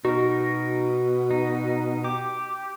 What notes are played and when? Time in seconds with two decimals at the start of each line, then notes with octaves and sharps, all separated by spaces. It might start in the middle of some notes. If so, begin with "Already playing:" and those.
0.05 B2 D#4 F#4 A#4
1.31 D#4
2.04 G4 D6